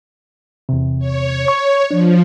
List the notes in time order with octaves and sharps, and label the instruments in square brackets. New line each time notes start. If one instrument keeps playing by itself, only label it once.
[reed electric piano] E2 C3
[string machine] C#5
[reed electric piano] C#6
[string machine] F3 [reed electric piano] D4